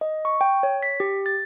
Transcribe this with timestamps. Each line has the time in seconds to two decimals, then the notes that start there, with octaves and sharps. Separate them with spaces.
0.01 D#5
0.25 C#6
0.41 G5
0.63 C#5
0.83 B6
1.00 G4
1.26 A6